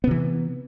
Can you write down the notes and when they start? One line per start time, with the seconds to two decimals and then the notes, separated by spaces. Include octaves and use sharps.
0.04 B3
0.07 C3
0.11 E3